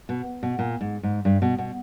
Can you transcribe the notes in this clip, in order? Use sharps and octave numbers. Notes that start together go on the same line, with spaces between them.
B2
B2
A#2
G#2
G#2
G2
B2
B2